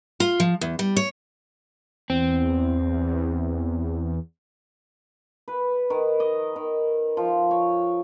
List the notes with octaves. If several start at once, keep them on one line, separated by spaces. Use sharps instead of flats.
F4
F3
E2
G3
C#5
E2 C4
B4
D#3
D#5
D#3
F3
C#5